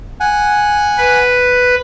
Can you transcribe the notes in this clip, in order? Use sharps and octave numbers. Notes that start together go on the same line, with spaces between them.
F#5 G#5
B4